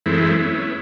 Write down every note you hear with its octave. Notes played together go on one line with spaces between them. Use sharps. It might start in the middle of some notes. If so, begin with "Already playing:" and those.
F#2 E3 G#3 A3 C4 E4
B3 C#4 E4